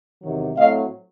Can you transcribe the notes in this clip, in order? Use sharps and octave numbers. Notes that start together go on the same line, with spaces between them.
E2 C3 D#3 F#3
A2 F#3 A3 C4 D#5 F5